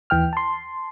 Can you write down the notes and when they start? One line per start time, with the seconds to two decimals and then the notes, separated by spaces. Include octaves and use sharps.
0.10 D#2 E3 G5 F6
0.33 A5 C6